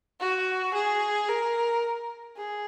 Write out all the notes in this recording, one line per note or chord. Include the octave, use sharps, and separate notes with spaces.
F#4
G#4
A#4
G#4